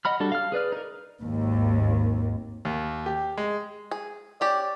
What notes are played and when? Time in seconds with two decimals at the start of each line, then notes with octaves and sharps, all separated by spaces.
0.05 D#5 F#5 B5 F6
0.20 G3 D4 F#4 A4
0.32 F5 F6
0.52 G#4 B4 D5 F6
0.72 D#4 A#4
1.21 G#1 D#2
2.65 D#2
3.06 G4
3.37 G#3
3.91 G#4
4.41 C#4 G4 D5